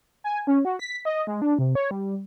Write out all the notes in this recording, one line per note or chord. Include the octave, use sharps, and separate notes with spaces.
G#5
C#4
F#4
B6
D#5
G#3
D4
C3
C#5
G3